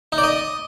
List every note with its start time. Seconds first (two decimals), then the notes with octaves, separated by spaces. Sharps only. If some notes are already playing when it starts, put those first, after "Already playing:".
0.12 D#4
0.18 D5
0.24 D#5